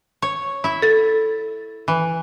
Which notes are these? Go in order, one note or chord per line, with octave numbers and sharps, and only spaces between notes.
C#5
E4 E5
A4 A6
E3